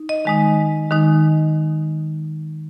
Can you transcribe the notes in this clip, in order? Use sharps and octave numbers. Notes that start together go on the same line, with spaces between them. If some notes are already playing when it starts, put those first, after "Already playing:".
Already playing: D#4
D#5
D#3 G#3 D#4
D#3 G#3 D#4